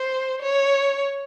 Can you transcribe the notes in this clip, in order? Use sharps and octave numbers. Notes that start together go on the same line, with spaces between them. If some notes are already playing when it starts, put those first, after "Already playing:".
Already playing: C5
C#5